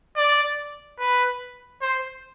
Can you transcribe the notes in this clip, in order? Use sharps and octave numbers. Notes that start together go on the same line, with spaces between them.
D5
B4
C5